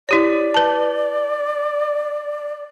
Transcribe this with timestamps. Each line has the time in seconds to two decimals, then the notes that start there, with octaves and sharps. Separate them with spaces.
0.09 E4 G4 C#5 D5
0.54 B4 A5